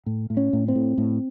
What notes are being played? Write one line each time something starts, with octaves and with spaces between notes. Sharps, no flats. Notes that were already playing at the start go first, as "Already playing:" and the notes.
A2
A2
C#4
A2
C4
A2
A2